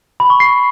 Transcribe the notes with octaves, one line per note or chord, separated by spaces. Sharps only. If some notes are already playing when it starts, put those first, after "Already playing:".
B5
C#6
C7